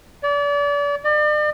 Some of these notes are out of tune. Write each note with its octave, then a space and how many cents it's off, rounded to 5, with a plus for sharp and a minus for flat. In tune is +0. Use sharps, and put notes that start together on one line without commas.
D5 -35
D5 +40